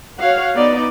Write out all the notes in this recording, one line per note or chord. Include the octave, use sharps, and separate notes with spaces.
F#4 C#5 F5 F#5
B3 D#4 D5